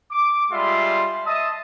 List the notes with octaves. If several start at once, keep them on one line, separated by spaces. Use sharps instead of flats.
D6
G3 G#3 F4 E5 C6
D#5 E5 A5 D#6